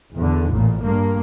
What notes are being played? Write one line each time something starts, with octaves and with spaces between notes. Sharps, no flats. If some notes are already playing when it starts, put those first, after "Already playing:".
E2 D3
A1 A#2
G2 A#3